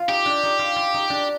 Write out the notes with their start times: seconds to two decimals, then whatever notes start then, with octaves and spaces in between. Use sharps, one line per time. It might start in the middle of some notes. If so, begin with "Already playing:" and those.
Already playing: F4
0.08 D#4 G4
0.26 D4
0.43 D#4
0.59 F4
0.76 F4
0.94 D#4
1.10 D4